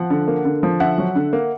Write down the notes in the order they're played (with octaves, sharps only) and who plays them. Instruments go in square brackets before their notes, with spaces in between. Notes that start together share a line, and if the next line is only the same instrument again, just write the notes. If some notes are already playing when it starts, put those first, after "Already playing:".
Already playing: [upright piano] F3 F#5
D3
A#3
D3
F3
D3 E5 F#5
F#3
D3
A#3